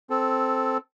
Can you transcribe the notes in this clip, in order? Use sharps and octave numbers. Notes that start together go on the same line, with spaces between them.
C4 A4